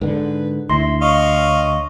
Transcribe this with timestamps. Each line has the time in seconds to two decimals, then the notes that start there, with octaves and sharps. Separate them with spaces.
0.01 G#2 D3 B4
0.70 D2 E4 C6 A#6
1.01 D#5 F5 C#6